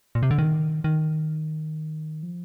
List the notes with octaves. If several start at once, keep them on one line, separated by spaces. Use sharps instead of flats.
A#2
C3
D3
D#3
D#3
F3